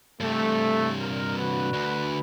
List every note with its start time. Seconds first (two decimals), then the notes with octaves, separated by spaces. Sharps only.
0.20 G2 C3 A3
1.00 A#2 A#4
1.37 D3 F#4 B4
1.73 D2